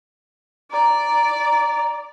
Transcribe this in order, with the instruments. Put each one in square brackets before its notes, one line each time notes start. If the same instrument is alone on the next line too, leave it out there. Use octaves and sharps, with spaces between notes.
[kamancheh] D5 [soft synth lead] A#5